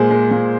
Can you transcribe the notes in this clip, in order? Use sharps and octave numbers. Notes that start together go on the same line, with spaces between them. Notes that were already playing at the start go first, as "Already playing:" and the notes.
Already playing: A#2 G#3 G#4 C5
G#3
A#2